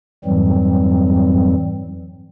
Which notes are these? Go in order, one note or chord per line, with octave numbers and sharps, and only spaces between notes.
F2 G#2 E3 F#3 G3 C4